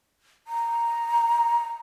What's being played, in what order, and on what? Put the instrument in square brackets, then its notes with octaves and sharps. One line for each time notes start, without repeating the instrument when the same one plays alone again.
[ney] A#5